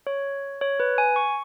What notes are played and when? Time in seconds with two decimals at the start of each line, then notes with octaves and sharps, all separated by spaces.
0.07 C#5
0.61 C#5
0.80 B4
0.98 G#5
1.16 C#6